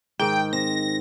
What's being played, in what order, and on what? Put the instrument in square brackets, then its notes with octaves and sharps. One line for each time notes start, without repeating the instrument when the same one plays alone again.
[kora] G#2 D#3 [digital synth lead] G5
[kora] C4 [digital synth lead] A#6